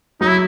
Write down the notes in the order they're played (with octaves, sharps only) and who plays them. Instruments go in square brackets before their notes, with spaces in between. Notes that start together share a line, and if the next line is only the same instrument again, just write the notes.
[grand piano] F#3 [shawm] D#4
[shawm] E4